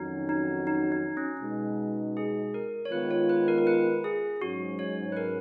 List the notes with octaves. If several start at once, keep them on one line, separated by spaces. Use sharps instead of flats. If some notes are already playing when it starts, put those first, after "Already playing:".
Already playing: F2 D#3 F#3 C#4 D#4 F#4
D#4
D#4
D#4
C#4
B2 G#3 D#4
G#4
A#4
C#5
D#3 G#3 B3 F4 B4
C#5
B4
A#4
A#4
B4
G#4
G#2 F#3 C#4 F#4
C#5
B4
A#4